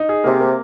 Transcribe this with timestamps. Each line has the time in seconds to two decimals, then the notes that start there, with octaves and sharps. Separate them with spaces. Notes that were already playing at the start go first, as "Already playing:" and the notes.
Already playing: D#4
0.09 G#4
0.24 C3 A#3
0.40 A#3